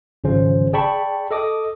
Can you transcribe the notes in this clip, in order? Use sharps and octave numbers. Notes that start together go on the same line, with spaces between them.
G#1 C#3 F3 C#4 C5
G#4 D5 G5 A5 B5 C#6
A4 D#5 D6 D#6